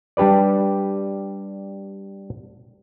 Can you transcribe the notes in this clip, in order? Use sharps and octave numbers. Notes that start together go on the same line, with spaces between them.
G3 D4 G4 B4 D5